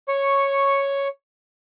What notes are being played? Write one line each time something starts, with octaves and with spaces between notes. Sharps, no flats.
C#5 C#6